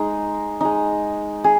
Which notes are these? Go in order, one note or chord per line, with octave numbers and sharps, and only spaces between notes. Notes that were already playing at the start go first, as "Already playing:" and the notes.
Already playing: G#3 D#4
G#3 D#4
G#4